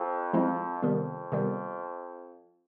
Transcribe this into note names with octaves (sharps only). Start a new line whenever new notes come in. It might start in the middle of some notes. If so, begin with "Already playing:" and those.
Already playing: F2
F3 G#3 C4 E4
F2 C3 D#3 G3 B3
C3 D#3 G3 B3